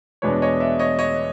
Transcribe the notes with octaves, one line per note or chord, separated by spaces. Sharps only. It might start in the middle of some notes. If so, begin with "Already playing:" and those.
E2 B2 G#3 B3 D4 B4 C#5
C#5 D#5
D5 E5
C#5 D#5
C#5 D#5